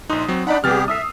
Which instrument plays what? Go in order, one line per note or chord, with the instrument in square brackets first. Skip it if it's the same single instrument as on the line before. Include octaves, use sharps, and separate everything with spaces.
[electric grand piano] A#1 D#4 [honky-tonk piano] C6 D#6 F#6
[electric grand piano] F#3 C4
[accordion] D4 D#4 B5 [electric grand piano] D5 F#5
[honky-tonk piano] C3 G3 [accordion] B3 G4 G#4 [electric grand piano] F6 A6
[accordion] E5 [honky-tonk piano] D#6 E6 C7